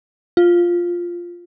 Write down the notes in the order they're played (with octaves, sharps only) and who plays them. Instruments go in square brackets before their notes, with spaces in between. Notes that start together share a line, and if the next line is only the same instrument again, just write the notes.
[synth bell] F4